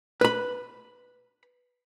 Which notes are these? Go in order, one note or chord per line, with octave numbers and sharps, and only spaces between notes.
B4 B5